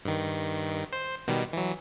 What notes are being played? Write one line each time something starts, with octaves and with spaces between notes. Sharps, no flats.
G2 D#3
C5
B2 D#3 G3
E3 F#3